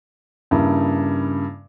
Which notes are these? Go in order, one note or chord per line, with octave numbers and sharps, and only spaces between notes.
G2 C#3 A#3 E4